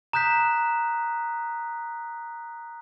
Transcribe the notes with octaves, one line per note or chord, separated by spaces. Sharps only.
A#5 D#6 F#6 G6 B6